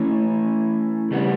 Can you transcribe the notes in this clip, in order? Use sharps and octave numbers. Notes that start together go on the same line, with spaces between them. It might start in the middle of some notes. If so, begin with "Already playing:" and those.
Already playing: E3 A3 C#4
C#3 G3 B3